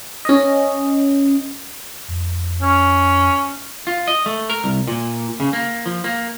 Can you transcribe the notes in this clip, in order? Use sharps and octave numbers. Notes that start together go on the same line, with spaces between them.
C#4 D#5
F2
C#4
F4
D#5
A3
A#4
C2
A#2
C#3
A#3
F3
A#3